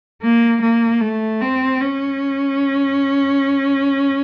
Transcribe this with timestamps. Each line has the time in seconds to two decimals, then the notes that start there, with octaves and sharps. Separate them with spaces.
0.22 A#3
0.62 A#3
1.01 A3
1.41 C4
1.80 C#4